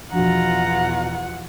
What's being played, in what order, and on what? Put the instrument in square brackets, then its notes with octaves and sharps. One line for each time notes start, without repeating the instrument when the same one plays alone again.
[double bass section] E2 B2 [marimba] F3 D4 F#4 [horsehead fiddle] F4 F#5 [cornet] A#5